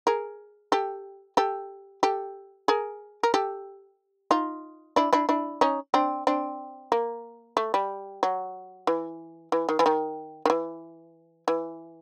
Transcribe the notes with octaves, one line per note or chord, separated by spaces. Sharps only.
G#4 A#4
G4 A4
G4 A4
G4 A4
G#4 A#4
A#4
G4 A4
D#4 F4
D4 E4
D4 E4
D4 E4
C#4 D#4
C4 D4
C4 D4
A#3
A3
G3
F#3
E3
E3
D#3
E3
D#3
D#3
E3
E3